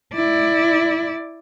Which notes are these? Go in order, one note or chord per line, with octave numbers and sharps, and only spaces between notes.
E4 D5